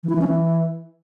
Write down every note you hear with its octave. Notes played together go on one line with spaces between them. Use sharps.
E3
E4
E3
C#4
E3